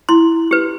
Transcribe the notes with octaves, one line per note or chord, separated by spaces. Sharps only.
E4 C6
G4 B4